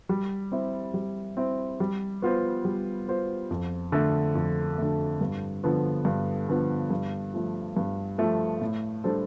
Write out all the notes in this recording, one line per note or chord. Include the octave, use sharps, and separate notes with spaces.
G3
C4 E4
G3
C4 E4
G3
B3 F4 C5
G3
B3 F4 C5
F2
D3 A3
F2
D3 A3
G2
D3 F3 B3
G2
D3 F3 B3
G2
F3 A3
G2
F3 A3
A2
G3 D4 A4 C5